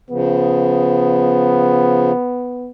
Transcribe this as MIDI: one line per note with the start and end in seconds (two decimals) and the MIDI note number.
0.10 2.12 49
0.10 2.12 53
0.10 2.71 59